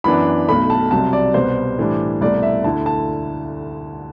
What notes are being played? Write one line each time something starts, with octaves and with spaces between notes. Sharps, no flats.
F#2 E3 B3 D4 B5
B1 B2 A3 B5
A5
C2 C3 F#3 A5
D5
C2 B2 G3 B3 C5
A2 E3 G3 D4
C2 B2 A3 E4 D5
E5
D2 D3 A3 E4 A5
A5